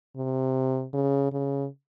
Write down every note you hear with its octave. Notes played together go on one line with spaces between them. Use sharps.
C3
C#3
C#3